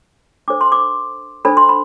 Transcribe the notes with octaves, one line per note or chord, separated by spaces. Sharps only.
D4 A4 C5 D6
C6
D6
D4 A4 C5 B5
C6
B5